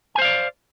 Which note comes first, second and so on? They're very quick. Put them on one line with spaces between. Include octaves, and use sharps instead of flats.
G#5 C5 F5 D5